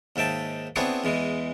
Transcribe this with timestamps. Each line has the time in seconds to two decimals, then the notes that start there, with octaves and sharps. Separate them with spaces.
0.16 D#2 G#2 E5 G5 A5
0.76 B3 C4 D4 E4 G#4 C#5
1.04 E2 E3 G#3